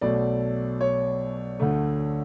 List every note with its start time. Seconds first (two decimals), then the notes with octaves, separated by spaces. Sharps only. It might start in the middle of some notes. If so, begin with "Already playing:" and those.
0.01 B1 B2 A3 D5
0.81 C#5
1.60 D2 D3 A3